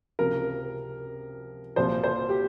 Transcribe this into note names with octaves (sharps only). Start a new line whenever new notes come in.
C#2 C3 F3 A#4
C2 A#2 F3 C5
C5
G4